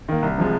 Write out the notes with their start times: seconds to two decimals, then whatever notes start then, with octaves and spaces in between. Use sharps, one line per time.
0.09 D#3 A#3
0.22 C2
0.38 C3 F3 G#3